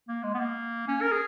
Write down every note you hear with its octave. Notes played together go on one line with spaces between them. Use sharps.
A#3
G#3
B3
A#3
C#4
A#4
G#4